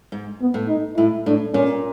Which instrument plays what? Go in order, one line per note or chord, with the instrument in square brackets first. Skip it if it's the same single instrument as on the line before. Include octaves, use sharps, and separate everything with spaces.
[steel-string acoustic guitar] G#2
[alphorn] B3
[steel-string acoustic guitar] A2
[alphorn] D#4
[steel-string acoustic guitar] A2 [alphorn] E4
[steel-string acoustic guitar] A2 [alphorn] D4
[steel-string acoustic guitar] A#2 [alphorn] C#4